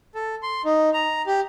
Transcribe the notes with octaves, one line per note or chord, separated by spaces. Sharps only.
A4
C6
D#4
A#5
G4